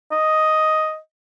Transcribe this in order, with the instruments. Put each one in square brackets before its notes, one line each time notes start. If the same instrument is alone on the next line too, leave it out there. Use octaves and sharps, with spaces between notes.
[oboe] D#5